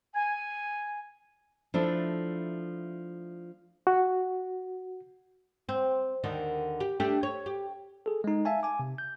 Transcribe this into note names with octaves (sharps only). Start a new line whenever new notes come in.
G#5
F3 A3 D4 E4
F#4
C4
D#2 D3 D#3
G4
A3 D4 G4
C#5
G4
G#4 A4
G#3 D#4
E5 F5 G#5 A5
G#5 D6
C3
G6